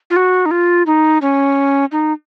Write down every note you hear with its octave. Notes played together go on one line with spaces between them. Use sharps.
F4
F#4
D#4
F4
D#4
C#4
D#4